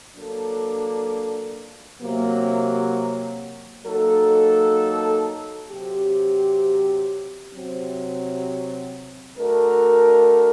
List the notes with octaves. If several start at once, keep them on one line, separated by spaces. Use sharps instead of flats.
F#3 A#3 D4 A4
C3 F#3 A#3
F#3 A#3 D#4 A4
C3 F#3 C4 G4
C3 F#3 C4
A3 D4 F#4 A#4